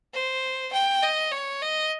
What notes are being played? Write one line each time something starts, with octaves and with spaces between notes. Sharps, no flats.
C5
G5
D#5
C#5
D#5